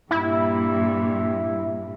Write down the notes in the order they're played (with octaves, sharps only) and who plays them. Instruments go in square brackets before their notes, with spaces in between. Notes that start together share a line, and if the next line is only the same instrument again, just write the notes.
[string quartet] G2 A#2 [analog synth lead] E4